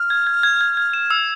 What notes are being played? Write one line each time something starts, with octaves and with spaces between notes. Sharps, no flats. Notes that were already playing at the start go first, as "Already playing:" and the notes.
Already playing: F6
G#6
G#6
G#6
G#6
G#6
E7
E6